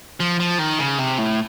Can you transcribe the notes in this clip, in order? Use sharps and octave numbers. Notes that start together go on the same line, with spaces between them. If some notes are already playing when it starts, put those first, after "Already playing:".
F3
F3
D#3
C#3
C3
A2